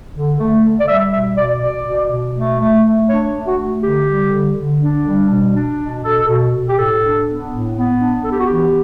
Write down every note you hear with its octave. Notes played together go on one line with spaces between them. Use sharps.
D3
A3
D3
D5
G3 E5
B2 E5
B2 D5
B2 D5
B2
B2
A3
A3
A3
D4 C#5
A3
F#4
A3
D3 G4
G3
D3
D3
D4
G3
B2
D4
B2
B2 A4
B2
B2
G4
A2 A4
D4
B3
A2
B3
D4
B3 A4
G4
F#4
E3 G4